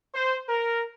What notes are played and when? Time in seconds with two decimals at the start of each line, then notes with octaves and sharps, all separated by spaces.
0.15 C5
0.49 A#4